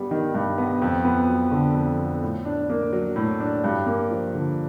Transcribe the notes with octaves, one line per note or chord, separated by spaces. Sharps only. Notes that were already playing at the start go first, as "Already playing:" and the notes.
Already playing: G2 G3 B3
D#3
G2
B3
F2
B3
F#3
D3
F2
B3
A2
D4
A#3
F#3
A2
D4
G2
A#3
F3
D3